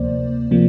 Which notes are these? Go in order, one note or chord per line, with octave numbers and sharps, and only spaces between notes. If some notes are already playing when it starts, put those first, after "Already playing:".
Already playing: D2 C3 F3 A#3 C5 D5
C3 F3 A#3